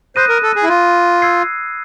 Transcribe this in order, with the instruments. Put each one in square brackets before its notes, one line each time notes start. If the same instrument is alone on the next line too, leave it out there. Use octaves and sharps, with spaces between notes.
[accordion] C5 [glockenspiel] B5 D#6 F#6 A#6 D#7
[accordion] A#4
A4
G#4
E4
F4
[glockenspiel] E6 G#6 C7